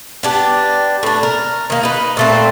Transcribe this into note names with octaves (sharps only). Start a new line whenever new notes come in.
B3 D4 G4
A2 D4
A#4
D#3 A#3
D#4 B4
A#2 A3 C4